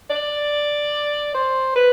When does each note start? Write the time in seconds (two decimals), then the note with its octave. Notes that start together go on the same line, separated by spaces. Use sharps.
0.10 D5
1.34 C5
1.76 B4